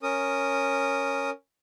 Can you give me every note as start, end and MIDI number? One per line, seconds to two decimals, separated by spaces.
0.03 1.30 61
0.03 1.30 70
0.03 1.30 87